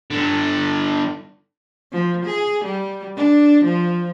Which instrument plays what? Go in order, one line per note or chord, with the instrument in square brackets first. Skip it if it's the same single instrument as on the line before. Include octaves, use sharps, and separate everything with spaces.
[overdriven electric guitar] G2 D3
[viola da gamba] F3
G#4
G3
D4
F3